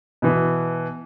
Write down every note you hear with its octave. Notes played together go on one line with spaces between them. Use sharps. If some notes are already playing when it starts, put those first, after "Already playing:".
B2 E3